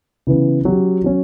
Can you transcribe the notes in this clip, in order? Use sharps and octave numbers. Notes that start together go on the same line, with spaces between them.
C#3 E3 B3
F#3 C#4 G4
F#3 C#4